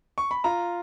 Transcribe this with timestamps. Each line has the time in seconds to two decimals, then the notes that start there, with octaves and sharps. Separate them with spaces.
0.18 C#6
0.31 B5
0.44 F4 A#5